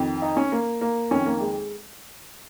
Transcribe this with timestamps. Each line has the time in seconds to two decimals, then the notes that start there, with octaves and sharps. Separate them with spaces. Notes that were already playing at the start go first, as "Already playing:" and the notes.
Already playing: F2 D#3
0.22 D#4
0.37 C#4
0.52 A#3
0.81 A#3
1.11 F2 D#3 C#4
1.26 A#3
1.40 G#3